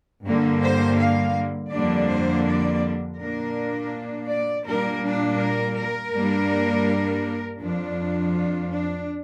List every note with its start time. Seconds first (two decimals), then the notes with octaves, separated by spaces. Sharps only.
0.24 G2 D3 G3 A#3
0.61 C5
0.98 F5
1.71 F2 D3 G3 A#3 D4 D5
2.08 C5
2.45 D5
3.18 A#2 A#3 D4 A#4
4.28 D5
4.65 A#2 G3 A#3 D4 A#4
5.02 D4
5.39 A#4
5.76 A#4
6.12 G2 G3 A#3 D4
7.59 F2 F3 D4
8.33 F4
8.70 D4